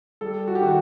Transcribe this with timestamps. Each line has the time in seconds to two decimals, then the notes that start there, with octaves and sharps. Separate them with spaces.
0.21 G3 A4
0.48 F#4
0.55 G4
0.61 D#3 F#4